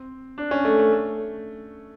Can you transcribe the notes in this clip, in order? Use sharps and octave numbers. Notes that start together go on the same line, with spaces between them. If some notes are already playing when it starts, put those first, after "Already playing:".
Already playing: C4
D4
C#4
A3
A3
A3